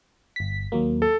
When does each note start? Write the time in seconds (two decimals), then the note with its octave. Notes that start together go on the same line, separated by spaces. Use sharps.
0.36 G1 B6
0.72 D#2 F#3 A#3
1.02 A4